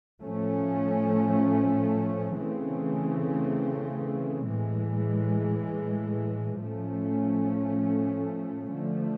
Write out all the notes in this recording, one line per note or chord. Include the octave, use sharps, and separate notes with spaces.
A2 F3 A3 C#4
C#3 E3 A3 C4
A2 E3 G#3
A2 F3 A3 C#4
D3 F3 A3